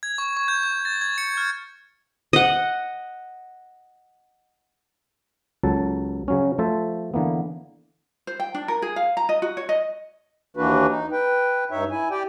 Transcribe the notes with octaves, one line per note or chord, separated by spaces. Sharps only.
G#6
C#6
C#6
G6
G6
A6
G#6
C#7
F6
D#5 F#5
C#2 F#3 A4 A5
C#3 F#3 C#4
F3 A3 A4 C5 E5 A5
D3 E3 A#3 B3
C5
G5
D4
A#4
G#4
F5
A#5
D#5
F#4
C#5
D#5
D#2 E3 A#3 D4 F#4 B4
D#4
B4 G5
G2 D#4 C#5 E5
E4 G#5
G4 D5 G5